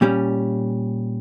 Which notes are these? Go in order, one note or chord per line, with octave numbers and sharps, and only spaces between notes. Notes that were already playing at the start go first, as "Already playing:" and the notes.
A#2 G3 C#4